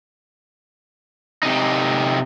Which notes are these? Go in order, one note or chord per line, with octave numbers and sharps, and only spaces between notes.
C3 D#4